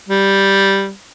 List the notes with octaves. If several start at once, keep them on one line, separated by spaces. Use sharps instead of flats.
G3